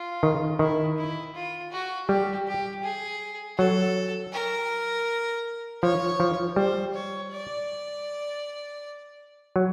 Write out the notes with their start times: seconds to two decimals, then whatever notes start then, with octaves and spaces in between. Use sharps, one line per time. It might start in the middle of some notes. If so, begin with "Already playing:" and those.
Already playing: F4
0.23 D#3
0.59 D#3 E4
0.97 E4
1.35 F4
1.72 F#4
2.08 G3 G4
2.47 G4
2.83 G#4
3.58 F#3 A4
4.32 A#4
5.83 F3 C#5
6.20 F3
6.56 G3 C5
6.94 C#5
7.32 D5
9.56 F#3